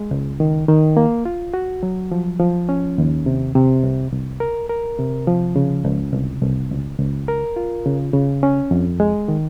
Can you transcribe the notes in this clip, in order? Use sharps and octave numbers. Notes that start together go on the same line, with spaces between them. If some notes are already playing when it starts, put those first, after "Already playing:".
Already playing: G#3
C#2
D#3
D#3
A#3
F4
F#4
F#3
F3
F3
C#4
D#2
C3
C3
C2
C2
A#4
A#4
C3
F3
C#3
C#2
C2
C2
C#2
C#2
A#4
F4
C#3
C#3
C#4
F2
G#3
D#3